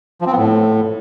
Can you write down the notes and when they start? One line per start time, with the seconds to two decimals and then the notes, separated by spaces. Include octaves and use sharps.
0.21 F3
0.27 C4
0.32 B3
0.37 A2